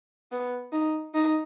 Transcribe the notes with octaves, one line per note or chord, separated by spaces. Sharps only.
B3
D#4
D#4